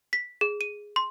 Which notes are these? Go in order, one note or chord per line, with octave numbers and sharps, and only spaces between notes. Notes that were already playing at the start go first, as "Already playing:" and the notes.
B6
G#4
D#7
C6